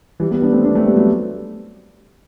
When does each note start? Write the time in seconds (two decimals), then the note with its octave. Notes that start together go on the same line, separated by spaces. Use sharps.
0.20 E3 G3
0.31 G3 B3
0.42 B3 D4
0.53 A3 C4
0.64 B3 D4
0.75 A3 C4
0.86 G3 B3
0.97 F#3 A3